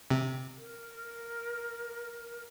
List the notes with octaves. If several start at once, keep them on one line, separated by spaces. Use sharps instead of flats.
C3
A#4